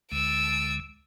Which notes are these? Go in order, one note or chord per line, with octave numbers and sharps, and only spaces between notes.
D2 D3 G#3 E6 D7